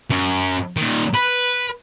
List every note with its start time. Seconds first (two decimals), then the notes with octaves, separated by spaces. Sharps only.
0.10 F#2
0.77 A#2 D#3
1.14 B4